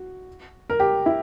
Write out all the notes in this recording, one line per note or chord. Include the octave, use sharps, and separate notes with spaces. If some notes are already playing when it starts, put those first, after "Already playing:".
Already playing: F#4
A#4
G4
E4